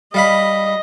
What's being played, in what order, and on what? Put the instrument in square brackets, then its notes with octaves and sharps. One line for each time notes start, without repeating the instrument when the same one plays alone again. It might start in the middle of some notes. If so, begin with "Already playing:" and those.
[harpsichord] G3 F5 B5 [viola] D#5